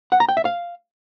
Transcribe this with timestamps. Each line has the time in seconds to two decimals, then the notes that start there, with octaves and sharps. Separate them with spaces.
0.12 F#5
0.20 A#5
0.29 G5
0.37 E5
0.45 F5